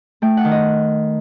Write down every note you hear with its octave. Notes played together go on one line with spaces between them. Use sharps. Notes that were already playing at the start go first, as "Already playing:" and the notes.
A3 G5
F#5
D#3
D#5